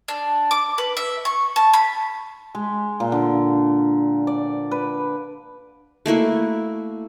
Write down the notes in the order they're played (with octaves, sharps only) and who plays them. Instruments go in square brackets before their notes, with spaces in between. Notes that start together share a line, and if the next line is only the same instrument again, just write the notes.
[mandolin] D4
D6
B4
E5
C#6
A5
B5
[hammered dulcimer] G#3
A#2
D3
D5
B4
[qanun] A3 A#3 E4 F#4